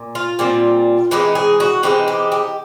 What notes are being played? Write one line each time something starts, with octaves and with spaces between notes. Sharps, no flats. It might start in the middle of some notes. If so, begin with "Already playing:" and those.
Already playing: A#2
F4
A#2 G3 C4
E3 G#3 C4 D#4 G4
G#4
F#4
E3 G#3 C4 D#4 G4
G4
G4